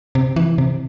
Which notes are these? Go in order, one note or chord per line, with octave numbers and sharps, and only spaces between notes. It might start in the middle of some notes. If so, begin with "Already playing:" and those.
C3
E3
C3